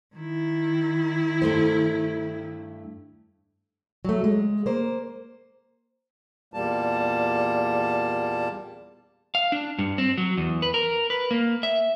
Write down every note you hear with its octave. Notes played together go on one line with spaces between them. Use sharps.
D#3 E4
G2 A3 C5
F#3 A3
G#3
A#3 C5
E2 A#2 G3 A#3 A5
F5
D4
G2
C4
F#3
E2
B4
A#4
B4
A#3
E5